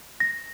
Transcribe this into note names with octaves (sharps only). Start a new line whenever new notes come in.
A#6